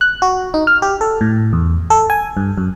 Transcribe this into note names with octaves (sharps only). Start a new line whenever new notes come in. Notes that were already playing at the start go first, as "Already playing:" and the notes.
F#6
F#4
D#4
F6
G4
A4
A2
E2
A4
G#5
G2
F#2